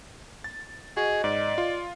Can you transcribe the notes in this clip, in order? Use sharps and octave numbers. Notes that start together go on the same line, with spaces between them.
A6
F#4 G#4 D#5
G#2 D5
F4